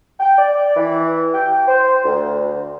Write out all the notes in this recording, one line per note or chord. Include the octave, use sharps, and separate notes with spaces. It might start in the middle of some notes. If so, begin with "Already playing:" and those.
G5
D5
E3
G5
C5
D2